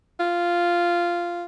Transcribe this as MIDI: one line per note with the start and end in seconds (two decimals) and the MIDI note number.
0.20 1.46 65